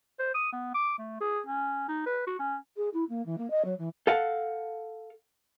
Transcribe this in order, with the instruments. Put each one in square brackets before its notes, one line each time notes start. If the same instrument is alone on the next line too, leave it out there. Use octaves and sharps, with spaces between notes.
[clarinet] C5
D#6
B3
D6
A3
G#4
C#4
D#4
B4
F#4
C#4
[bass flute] G#4
E4
A#3
E3
A#3
D#5
F#3
E3
[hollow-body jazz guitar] A4 F5 F#5